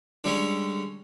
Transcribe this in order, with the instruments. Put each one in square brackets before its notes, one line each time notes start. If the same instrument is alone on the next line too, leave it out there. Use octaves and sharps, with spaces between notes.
[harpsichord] D3 G3 G#3 C#4